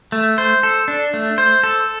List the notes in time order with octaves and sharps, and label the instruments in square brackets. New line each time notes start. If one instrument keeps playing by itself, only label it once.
[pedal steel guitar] A3
C5
A4
D4
A3
C5
A4